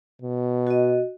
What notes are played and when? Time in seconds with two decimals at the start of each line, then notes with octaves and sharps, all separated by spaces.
0.22 B2
0.67 F#4 D#5